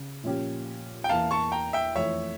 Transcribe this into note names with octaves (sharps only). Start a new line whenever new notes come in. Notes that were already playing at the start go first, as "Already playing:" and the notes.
Already playing: C#3
A#2 F3 C#4 G4
G5
E2 E3 A#3 F5 A5
A5 C#6
G5 A#5
E5 G5
F2 E3 A3 C#5 E5